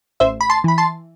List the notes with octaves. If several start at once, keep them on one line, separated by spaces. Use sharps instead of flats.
A1 C5 E5
B5
A5 C6
E3 B5
A5 C6